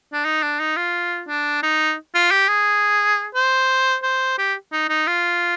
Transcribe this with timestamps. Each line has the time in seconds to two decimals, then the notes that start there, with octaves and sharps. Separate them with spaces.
0.13 D4
0.25 D#4
0.42 D4
0.60 D#4
0.77 F4
1.28 D4
1.63 D#4
2.15 F4
2.31 G4
2.48 G#4
3.35 C5
4.03 C5
4.38 G4
4.73 D#4
4.89 D#4
5.07 F4